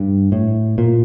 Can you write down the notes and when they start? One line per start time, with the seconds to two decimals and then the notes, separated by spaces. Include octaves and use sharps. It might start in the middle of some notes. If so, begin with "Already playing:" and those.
Already playing: G2
0.32 A2
0.78 A#2